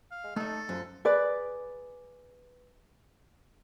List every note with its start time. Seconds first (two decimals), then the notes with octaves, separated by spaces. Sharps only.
0.11 F5
0.24 G#3
0.36 A3 D#4 A4 E5
0.69 F#2 F3
1.05 G#4 B4 D5